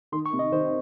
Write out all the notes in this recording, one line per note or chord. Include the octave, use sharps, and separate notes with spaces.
D#3 C6
C#6
C3
D#5
D#3 C5